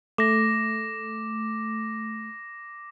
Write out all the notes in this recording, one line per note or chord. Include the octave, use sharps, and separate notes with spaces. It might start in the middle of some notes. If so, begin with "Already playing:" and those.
A3 D6 A#6